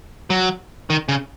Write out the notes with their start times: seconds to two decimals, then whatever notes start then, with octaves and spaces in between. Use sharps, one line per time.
0.30 F#3
0.90 D#3
1.09 C#3